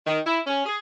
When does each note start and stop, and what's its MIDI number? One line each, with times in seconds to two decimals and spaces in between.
0.06 0.19 51
0.25 0.39 64
0.46 0.65 61
0.66 0.77 68